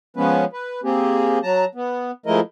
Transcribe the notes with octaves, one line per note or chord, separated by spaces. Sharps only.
F3 G#3 B3 C#4 B4
B4
A#3 C4 G4 G#4
F#3 A5 A#5
B3
F3 G#3 A3 E4 A#4 D#5